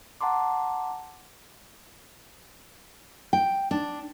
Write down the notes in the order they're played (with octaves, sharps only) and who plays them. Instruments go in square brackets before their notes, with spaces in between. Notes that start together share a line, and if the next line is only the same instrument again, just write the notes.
[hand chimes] F#5 A5 A#5 C6 D6
[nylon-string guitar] G5
D4